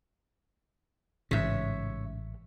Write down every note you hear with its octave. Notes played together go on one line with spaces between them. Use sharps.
A1 G#2 C#3 C#5 E5